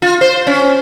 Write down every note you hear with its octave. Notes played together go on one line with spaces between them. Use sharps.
F4
C5
C#4